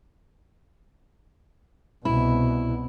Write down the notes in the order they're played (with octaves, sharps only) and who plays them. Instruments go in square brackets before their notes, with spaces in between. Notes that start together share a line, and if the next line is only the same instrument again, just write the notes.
[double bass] C2 B2 [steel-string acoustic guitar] E4